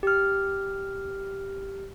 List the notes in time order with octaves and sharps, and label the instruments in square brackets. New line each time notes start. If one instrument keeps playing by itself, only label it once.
[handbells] G4 F6